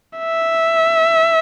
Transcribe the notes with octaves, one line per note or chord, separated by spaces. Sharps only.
E5